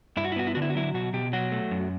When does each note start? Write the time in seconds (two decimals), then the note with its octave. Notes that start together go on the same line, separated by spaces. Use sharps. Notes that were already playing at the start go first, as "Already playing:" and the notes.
0.17 G2 E4
0.24 F#4
0.32 E4
0.36 B3 F#4
0.47 E4
0.55 D3 F#4
0.62 E4
0.70 F#4
0.75 F#3 E4
0.94 B2 F#4
1.13 B2 G4
1.33 F#3 F#4
1.52 A3
1.71 F#2